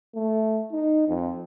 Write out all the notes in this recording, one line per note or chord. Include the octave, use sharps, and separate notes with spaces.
A3
D#4
F2